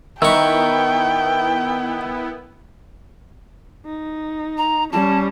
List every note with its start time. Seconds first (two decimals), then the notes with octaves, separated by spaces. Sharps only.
0.22 D#3 B3 E4 A#4 E5 G5 C#6
3.86 D#4
4.58 A#5
4.92 G3 C#4 A5